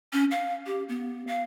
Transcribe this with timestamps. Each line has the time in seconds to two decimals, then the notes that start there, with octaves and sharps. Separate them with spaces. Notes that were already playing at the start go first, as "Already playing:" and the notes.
0.13 C#4
0.31 F5
0.66 G4
0.89 B3
1.27 F5